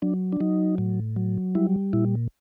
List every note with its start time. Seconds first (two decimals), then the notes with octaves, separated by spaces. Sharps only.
0.02 F#3 D4
0.33 D4
0.40 F#3 D#4
0.78 A2
1.16 F#3
1.55 G3 E4
1.93 A#2 E4